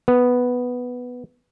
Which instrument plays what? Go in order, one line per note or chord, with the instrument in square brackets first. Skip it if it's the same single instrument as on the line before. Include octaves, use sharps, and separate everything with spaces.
[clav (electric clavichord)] B3